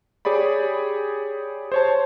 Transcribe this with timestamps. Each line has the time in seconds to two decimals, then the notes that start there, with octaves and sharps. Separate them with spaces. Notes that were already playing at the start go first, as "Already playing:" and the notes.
0.25 G4 G#4 C#5 D5 B5
1.72 C5 C#5 A5